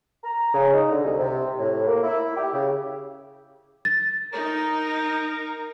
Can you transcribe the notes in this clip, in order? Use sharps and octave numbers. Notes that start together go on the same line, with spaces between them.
A#5
C#3
D#4
D3
C2
C3
A2
A#3
E4
G4
C#3
A6
D#4 A#4